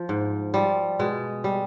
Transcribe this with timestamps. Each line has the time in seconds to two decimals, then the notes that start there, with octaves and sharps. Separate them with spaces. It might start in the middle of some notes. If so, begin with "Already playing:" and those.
Already playing: F3
0.09 G#2
0.54 F3 G3
0.99 B2 G#3
1.44 G3